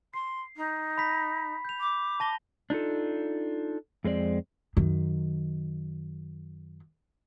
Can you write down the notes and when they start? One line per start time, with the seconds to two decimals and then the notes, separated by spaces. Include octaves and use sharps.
0.14 C6 C7
0.56 D#4
0.98 B5 B6
1.65 G6 F7
1.80 D6
2.20 A5 A#6 G7
2.70 D4 D#4 F4 A4
4.04 F2 G#3 C4 D5
4.77 F#2 D#3